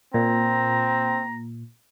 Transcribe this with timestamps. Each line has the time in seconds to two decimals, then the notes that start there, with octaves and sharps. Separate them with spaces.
0.14 A#2 C4 A#5